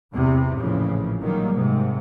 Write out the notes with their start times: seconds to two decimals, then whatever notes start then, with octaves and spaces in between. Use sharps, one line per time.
0.13 E2 C3
0.58 A1 A#2 C#3 E3 F3
1.20 D#3 F#3 G3 A#3
1.52 G#2 C3